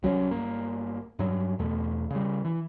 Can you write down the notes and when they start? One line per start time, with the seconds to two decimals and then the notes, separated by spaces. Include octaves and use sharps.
0.03 C2 F#3 C4 C#4
0.31 G1 A#3
1.19 G2 F#3
1.59 E2 B2 A3
2.10 C#3 G3
2.45 E3